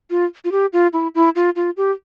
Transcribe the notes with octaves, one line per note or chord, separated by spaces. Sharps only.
F4
F4
G4
F4
E4
E4
F4
F4
G4